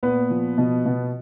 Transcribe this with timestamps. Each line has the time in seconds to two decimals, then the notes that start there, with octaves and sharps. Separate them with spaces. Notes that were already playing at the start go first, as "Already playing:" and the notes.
0.03 A#2 B3 B4
0.30 F3
0.58 B2
0.85 B2